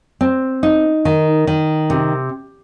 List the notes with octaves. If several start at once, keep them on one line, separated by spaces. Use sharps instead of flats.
C4
D#4
D#3
D#3
C3